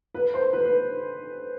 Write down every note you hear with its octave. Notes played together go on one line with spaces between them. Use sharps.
B4
C5
B4
B4